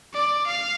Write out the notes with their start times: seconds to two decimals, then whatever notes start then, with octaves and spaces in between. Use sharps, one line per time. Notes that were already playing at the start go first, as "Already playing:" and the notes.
0.13 D5
0.46 F5